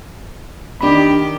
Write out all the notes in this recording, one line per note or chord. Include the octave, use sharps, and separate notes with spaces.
D#3 D4 G4 B5